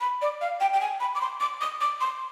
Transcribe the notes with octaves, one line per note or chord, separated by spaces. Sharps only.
B5
D5
F5
G5
G5
G#5
B5
D6
C6
D6
D#6
D6
C6